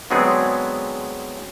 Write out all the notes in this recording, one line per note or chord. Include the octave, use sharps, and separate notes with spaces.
D3 F#3 G#3 B3 C4 G#4